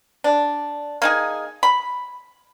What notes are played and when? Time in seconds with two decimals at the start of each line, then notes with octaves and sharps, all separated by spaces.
0.24 D4
1.02 A#3 D#4 G#4
1.63 B5